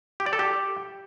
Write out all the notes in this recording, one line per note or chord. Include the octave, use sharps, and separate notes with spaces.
G4
D5
A4
G4